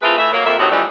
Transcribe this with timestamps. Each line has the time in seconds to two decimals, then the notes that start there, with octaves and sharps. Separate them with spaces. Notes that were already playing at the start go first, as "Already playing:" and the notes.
0.02 A3 C4 E4 F4 G#4 B4
0.18 E3 A3 E5
0.33 F#3 A#3
0.46 F2 A#3 E5
0.59 A2 C3 F#3 D#4 F#4 G4
0.71 E3 F3 G3 A3 D4 D#4